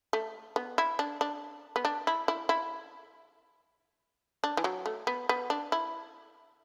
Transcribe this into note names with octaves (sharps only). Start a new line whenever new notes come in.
A3
B3
E4
D4
D4
B3
D4
E4
E4
E4
D4
E3
F#3
A3
B3
B3
D4
E4